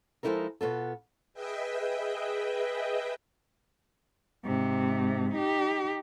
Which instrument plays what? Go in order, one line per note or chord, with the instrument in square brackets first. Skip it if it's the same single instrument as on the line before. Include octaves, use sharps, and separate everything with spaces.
[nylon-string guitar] F3 G#3 D#4 E4 A4 A#4
B2 B3 F4 A4
[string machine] G#4 B4 D#5 E5 G5
[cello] G#2 C3
D#4 G4